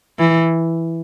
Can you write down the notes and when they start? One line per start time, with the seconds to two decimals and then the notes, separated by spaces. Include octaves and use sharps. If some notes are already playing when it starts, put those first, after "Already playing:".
0.19 E3